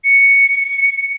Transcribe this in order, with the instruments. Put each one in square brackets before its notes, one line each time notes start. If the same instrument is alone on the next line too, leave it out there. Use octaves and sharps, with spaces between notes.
[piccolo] C#7